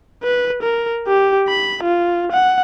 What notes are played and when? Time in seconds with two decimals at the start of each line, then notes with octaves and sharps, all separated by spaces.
0.24 B4
0.63 A#4
1.07 G4
1.48 B5
1.83 F4
2.32 F#5